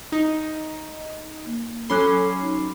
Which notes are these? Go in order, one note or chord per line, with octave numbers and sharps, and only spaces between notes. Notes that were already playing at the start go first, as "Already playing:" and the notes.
D#4
A#3
F#3 C#4 A4 B5 C6 D6 F#6
D#4